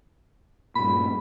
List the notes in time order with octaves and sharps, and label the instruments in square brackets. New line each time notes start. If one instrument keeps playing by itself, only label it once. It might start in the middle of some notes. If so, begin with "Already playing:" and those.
[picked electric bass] G2 A#2 [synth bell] B5